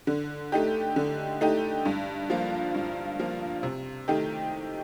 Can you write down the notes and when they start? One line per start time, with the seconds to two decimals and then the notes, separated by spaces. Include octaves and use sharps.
0.07 D3
0.52 A3 D#4 G4
0.96 D3
1.41 A3 D#4 G4
1.85 G2
2.30 F3 A#3 F4
2.74 G2
3.19 F3 A#3 F4
3.63 C3
4.08 D#3 A3 D#4 G4